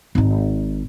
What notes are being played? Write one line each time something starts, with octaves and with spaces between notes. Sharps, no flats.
G#1 D#4